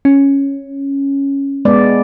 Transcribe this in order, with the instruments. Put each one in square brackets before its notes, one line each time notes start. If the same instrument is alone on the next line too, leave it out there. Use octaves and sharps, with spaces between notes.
[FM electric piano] C#4
[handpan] G#3 B3 D5